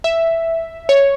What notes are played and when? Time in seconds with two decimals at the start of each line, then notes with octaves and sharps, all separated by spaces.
0.04 E5
0.89 C#5